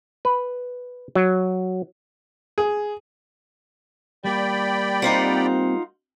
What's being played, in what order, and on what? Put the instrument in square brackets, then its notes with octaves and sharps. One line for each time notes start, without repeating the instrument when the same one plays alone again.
[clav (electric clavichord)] B4
F#3
[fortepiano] G#4
[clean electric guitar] G3 A#3 [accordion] D5 G5 B5
[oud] C4 G4 [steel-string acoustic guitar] D#4 F4 F#5